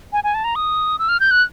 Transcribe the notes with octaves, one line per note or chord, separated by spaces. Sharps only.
G#5
G#5
A5
A#5
D#6
E6
F6
G6
F#6